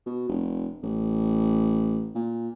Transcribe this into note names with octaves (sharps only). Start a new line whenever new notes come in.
B2
F1
A1
A#2